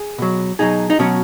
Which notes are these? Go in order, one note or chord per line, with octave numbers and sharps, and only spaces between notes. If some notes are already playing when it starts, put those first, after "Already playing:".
Already playing: G#4
B2 F#3
B2 F#3 D#4 G#4
D#4
B2 F#3 C#4 F#4